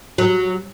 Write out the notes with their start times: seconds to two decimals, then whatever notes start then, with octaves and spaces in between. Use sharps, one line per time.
0.18 F#3